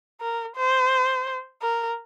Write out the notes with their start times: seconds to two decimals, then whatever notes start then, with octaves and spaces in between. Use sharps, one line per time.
0.21 A#4
0.56 C5
1.62 A#4